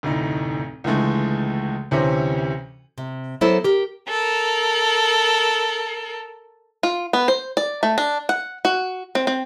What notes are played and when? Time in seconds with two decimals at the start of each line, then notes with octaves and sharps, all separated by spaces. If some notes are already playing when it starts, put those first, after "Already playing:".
0.03 F1 D2 A2 D#4
0.84 C#2 D3 E3 G#3 A3
1.91 D2 C3 E3 C#4 C5
2.98 C3
3.41 F#3 B3 E4 A4 A#4 C5
3.64 G4 A#4
4.08 A4 A#4
6.83 F4
7.13 B3
7.28 C5
7.57 D5
7.83 A3
7.98 D4
8.29 F#5
8.65 F#4
9.15 C4
9.27 C4